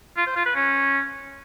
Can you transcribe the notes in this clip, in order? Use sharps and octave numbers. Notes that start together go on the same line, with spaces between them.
F4
C5
F4
B4
C#4